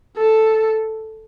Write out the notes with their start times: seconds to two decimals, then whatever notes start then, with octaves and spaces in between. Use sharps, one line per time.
0.18 A4